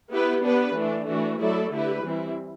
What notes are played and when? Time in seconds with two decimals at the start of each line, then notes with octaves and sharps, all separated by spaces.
0.11 B3 E4 G4 B4
0.43 B3 D4 G4 B4
0.76 E3 A3 D4
1.07 E3 A3 D4 F#4
1.40 F#3 A3 E4 A4 D5
1.72 D3 A3 E4 G4 B4
2.04 E3 G3 C4 E4